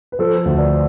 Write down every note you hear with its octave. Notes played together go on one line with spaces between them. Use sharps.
B4
F3 A4 C5
D2
B4 D5